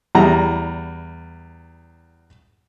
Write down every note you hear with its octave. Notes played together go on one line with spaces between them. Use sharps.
E2 G3 E4 A#5